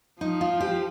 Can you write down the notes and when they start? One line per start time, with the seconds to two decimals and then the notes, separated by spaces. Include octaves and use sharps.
0.21 F3 D#4
0.41 F4
0.60 G4